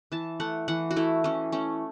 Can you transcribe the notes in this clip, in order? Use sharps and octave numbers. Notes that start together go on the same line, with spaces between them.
E3 A5
A3 F#5
E3 F#5
F#4
A3 E4
E3 C#4
A3 C#4